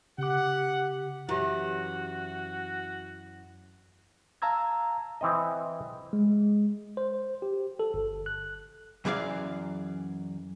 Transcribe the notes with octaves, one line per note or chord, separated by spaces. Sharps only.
C#3 G4 F#5 D6
F#2 E3 E4 F#4 G4 E5
F5 A5 A#5 E6 G#6
E3 C4 D#5
G#3
C5
G4
A4
G1
F#6
F#2 E3 G#4 D5 F5